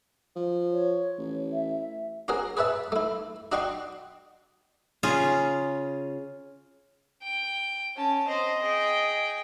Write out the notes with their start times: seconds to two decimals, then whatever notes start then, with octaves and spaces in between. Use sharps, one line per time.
0.36 F3
0.73 C#5
1.18 A1
1.53 E5
2.28 C#4 F#4 G#4 A#4
2.57 G#4 B4 C#5 E5 A5
2.92 A3 E4
3.52 D4 F#4 D#5 G5 C6 C#6
5.03 C#3 C#4 F4 G#4
7.23 G5
7.96 C#4 A5
8.27 C4 C5 D#5
8.61 G#4 G5